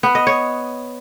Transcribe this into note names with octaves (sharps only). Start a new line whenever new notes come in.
B3
D#5
C#5